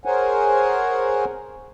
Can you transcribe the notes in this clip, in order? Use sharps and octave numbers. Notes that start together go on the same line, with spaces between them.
G#4 A#4 C5 C#5 F#5 G#5